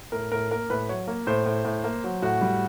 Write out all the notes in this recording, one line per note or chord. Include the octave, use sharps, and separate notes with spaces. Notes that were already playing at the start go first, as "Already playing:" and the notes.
A2 A#4
A2 A#4
A#3 A#4
A2 B4
F#3 C#5
A#3
A2 C5
A2
A2
A#3
F#3
A2 F#4
G3